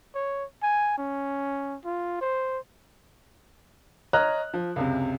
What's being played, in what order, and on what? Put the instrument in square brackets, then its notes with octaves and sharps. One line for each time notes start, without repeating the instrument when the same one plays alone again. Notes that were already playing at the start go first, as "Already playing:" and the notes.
[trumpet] C#5
G#5
C#4
F4
C5
[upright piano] C#5 D#5 A#5 F6 F#6
F3
C#2 F#2 C3